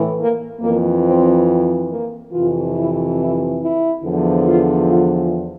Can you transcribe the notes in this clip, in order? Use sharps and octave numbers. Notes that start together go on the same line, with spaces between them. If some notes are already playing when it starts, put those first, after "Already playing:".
Already playing: A2 E3
A#3
F2 E3 A#3
C4
A#3
F2 C3 E3 F4
E4
E4
E4
E2 D3 F3
F4
F4